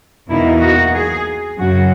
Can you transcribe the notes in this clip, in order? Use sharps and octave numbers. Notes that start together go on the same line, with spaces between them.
E2 B2 A#3 D#4 E4
F#4
G#4
F#2 C#3 F#3 F#4